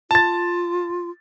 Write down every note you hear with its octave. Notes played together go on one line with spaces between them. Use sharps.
F4 A5 A6